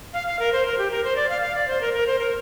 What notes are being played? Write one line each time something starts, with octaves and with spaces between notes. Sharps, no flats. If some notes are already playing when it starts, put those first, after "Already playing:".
F5
F5
A#4
C5
A#4
G4
A#4
C5
D5
F5
F5
D5
C5
A#4
A#4
C5
A#4